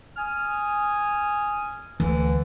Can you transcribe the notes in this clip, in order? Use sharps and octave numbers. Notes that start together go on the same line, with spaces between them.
G#5 D#6 F6
D2 D3 E3 A3